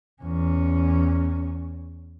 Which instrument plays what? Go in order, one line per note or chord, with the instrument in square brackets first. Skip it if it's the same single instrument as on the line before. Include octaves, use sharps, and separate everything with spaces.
[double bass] E2 C#4